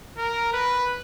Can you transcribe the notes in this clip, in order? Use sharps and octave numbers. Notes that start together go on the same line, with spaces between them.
A#4
B4